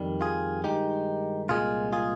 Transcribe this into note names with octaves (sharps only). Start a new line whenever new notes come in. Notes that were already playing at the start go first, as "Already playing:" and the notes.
Already playing: F2 D#3 G3
F4 G#4
G2 D#3 G#3 D#4 G4
C2 A#2 G#3 F4 G#4
F4 G#4